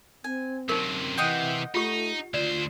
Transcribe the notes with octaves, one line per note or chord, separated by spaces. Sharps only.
C4 G#5
F#2 C3 C#4 D#4 A#4
C3 E3 D#5 F#5 G5
A3 D#4 F4 G4 C#6
D2 F4 C5 D5